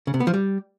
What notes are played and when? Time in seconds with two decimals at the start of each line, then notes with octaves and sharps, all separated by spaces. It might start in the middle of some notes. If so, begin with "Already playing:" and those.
0.07 C#3
0.14 C3
0.20 B3
0.27 F3
0.34 G3